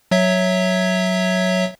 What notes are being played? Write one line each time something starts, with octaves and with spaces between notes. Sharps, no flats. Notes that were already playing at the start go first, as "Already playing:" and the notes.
F#3 C#5 E5